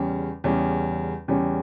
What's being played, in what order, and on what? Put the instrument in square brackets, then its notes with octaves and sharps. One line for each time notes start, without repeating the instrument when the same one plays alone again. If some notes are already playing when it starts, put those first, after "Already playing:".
Already playing: [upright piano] E2 C#3 G3 C#4
E2 C#3 G3 C#4
E2 C#3 G3 C#4